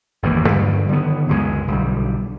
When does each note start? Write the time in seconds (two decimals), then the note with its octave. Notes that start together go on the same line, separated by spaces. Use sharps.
0.23 G1 E2 D#3 A#3
0.49 G2 D3 F#3 G3
0.89 D3 D#3 G#3 B3
1.29 C#2 F#2 F3 G#3
1.68 B1 D3 G3